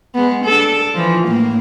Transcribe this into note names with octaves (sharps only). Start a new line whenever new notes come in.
G#3 B3
D4 A4
E3 F3
A2 A#3